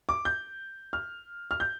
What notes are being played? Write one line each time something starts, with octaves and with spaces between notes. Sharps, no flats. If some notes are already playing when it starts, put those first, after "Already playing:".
D6
G6
F6
F6
G6